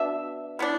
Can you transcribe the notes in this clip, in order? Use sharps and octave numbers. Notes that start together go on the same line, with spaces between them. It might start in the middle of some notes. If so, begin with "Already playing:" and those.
Already playing: B2 B3 D4 E5
E3 B3 D4